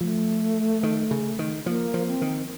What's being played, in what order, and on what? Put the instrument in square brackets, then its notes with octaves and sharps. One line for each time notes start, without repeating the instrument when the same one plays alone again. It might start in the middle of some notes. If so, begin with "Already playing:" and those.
[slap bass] F3 [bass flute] A3
[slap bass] D#3
C#3
D#3
[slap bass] F3 [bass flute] A#3
[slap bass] F3
[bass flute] C4
[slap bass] D#3